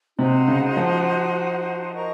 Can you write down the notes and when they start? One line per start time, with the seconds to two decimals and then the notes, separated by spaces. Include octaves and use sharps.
0.18 C3 D#4 F#4 C5 F#5
0.48 C#3
0.77 F3
1.93 A#4 D#5 A#5 C#6